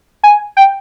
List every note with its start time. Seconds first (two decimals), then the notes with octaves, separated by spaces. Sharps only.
0.23 G#5
0.57 G5